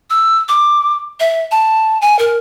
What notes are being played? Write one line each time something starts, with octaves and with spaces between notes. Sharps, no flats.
E6
D6
E5
A5
G#5
A#4